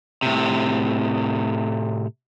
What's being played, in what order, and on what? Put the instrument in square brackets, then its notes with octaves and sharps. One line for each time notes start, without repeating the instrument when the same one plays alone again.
[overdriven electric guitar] A2 C3